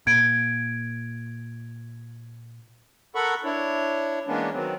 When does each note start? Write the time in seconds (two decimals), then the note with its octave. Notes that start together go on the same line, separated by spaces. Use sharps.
0.07 A#2 G#6 D7
3.15 A4 A#4 F#5 B5 C#6
3.44 D4 E4 C#5
4.28 E3 G#3 A#3 B3 C#4 D4
4.53 D#3 F#3 B3 C4